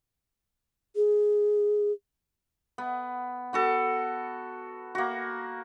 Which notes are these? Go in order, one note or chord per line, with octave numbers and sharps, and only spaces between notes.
G#4
B3
B3 F#4 A4
A#3 F#4